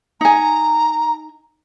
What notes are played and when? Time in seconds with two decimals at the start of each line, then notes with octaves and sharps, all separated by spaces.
0.21 D#4 G#5 A#5